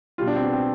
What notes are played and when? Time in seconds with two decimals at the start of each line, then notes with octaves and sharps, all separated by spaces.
0.18 B2 G3 F4
0.28 D4
0.36 C4
0.44 B3
0.53 C4